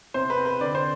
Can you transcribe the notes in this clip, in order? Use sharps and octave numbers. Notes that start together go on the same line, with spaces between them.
C3 C5
B4
C4
B4
D3 D5
C5